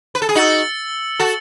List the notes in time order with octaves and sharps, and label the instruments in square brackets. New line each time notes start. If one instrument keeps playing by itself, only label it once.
[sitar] B4
A4
G#4
[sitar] D#4 F#4 [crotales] E6 A6 C#7 F#7
[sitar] F#4 A4